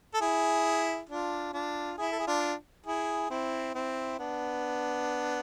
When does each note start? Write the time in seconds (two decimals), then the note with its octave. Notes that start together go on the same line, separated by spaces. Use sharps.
0.14 A4
0.21 E4 G#4
1.09 D4 F4
1.53 D4 F4
1.98 E4 G#4
2.12 A4
2.19 G#4
2.27 D4 F4
2.86 E4 G#4
3.30 C4 E4
3.75 C4 E4
4.19 B3 D4